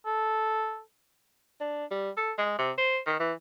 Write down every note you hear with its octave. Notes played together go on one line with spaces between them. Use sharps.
A4
D4
G3
A4
G#3
C3
C5
D#3
E3